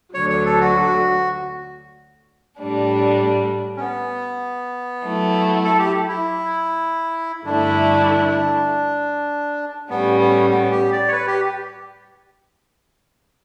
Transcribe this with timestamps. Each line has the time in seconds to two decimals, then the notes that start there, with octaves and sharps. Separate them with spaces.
0.14 D2 D3 F#3 C#5
0.30 C#5
0.46 A4
0.60 F#4
2.59 A2 G3 D4
3.77 C#4
3.80 B3
5.03 F#3 A3 E4
5.64 A4
5.79 G4
6.08 E4
7.46 G2 D3 A3 D4 E4
9.90 A2 G3 B3 C#4
10.20 B3
10.51 B3
10.72 G4
10.92 D5
11.08 C#5
11.12 B4
11.27 G4